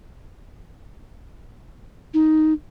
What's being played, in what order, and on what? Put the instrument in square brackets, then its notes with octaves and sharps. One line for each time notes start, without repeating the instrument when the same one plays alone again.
[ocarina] D#4